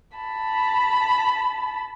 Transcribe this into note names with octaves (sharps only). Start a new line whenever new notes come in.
A5 B5